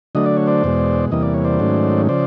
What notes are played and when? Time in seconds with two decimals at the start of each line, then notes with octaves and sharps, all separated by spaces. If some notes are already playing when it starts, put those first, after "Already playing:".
0.15 D3 F#3 A3 D4 D#5
0.26 D5
0.37 C#5
0.47 C5 D5
0.64 E2 B2 G#3
1.11 E2 C3 E3 G3 A#3 D#5
1.23 D5
1.34 C#5
1.44 C5 D5
1.59 G#2 D#3 F#3 A3 C#4
2.09 C#3 F3 C5 D5